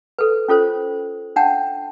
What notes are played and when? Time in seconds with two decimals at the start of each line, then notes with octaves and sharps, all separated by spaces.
0.19 A4 B4
0.48 C#4 F4 A4 C5
1.36 D4 F#5 G5 A5